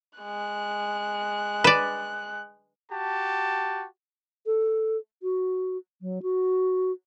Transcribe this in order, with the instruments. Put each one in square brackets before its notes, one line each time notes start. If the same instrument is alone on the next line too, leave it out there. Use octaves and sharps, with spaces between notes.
[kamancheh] G#3 F#6
[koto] B4 D5
[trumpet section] F#4 G4 A5
[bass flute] A4
F#4
F#3
F#4